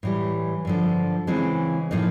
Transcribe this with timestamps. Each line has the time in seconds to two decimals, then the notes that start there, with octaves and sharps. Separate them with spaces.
0.03 A2 E3 G3
0.65 G2 D3 F3
1.27 C#3 E3 G#3 C4
1.91 A2 F3 A#3 D#4